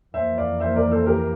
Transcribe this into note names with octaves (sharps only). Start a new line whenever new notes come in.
F2 E3 A#3 C5 E5
D5 F5
C5 E5
A#4 D5
A4 C5
G4 A#4